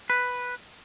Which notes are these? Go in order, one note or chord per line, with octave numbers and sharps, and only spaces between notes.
B4